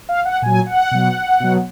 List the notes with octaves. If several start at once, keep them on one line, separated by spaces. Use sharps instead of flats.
F5
F#5
A#2 F#3 G#5
F#5
B2 F#3
B2 F#3